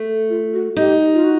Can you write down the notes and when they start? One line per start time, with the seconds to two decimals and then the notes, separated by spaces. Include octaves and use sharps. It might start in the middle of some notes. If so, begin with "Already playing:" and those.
Already playing: A3
0.30 F4
0.53 F#4
0.76 D#4 G4
1.14 F4
1.24 F#4